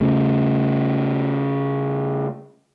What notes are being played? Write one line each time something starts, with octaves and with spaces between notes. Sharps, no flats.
C#3 A3